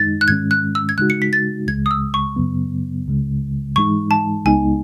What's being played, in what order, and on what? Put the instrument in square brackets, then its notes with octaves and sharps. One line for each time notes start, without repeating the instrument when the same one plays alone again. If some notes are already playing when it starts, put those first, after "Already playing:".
Already playing: [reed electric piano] F#2 D#3 G#3 D#4 [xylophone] A6
[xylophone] F#6
[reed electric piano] G#2 D#3 G#3 C#4 [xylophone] G#6
[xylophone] F#6
E6
G#6
[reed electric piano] C#3 G#3 D#4 F#4 [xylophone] F#6
[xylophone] C#7
B6
A6
[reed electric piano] C#2 C#3 G#3 [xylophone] G#6
[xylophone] D#6
E6
C#6
[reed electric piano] F#2 C#3 F#3 B3
C#2 C#3 G#3
[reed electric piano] G#2 E3 G#3 D#4 [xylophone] C#6
[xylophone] A5
[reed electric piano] C#2 C#3 G#3 B3 D#4 [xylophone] G#5